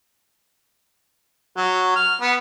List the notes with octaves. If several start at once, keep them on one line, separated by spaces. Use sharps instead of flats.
F#3
F6
B3